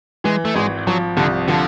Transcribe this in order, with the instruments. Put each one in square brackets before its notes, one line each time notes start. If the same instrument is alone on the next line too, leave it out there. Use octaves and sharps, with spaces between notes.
[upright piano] E3 [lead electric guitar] G#3
[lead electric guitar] A3
[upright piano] G#1 [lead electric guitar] G#3
[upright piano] F3 [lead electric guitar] F#3
[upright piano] C2 [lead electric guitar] D3
[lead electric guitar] D3 [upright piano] F3